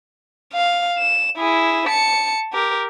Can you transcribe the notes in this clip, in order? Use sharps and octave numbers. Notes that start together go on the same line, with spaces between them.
F5
E7
E4 G#4
A5 C#7
G4 A#4